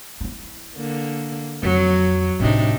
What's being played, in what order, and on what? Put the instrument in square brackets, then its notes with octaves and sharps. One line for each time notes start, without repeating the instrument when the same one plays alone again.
[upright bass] D#4 E4
[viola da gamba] D3 A#3
[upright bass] F2 [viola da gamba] F#3
[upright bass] A2 F#3 [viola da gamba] C3 D4 D#4